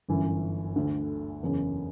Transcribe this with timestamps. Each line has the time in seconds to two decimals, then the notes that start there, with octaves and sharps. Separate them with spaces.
0.09 G1 F#2 E3
0.76 D2 D3 A3
1.42 F#1 E2 C#3